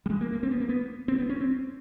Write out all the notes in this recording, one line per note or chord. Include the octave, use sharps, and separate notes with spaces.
G3
G#3
A#3
A#3
C4
B3
A#3
B3
C4
B3
C#4
C4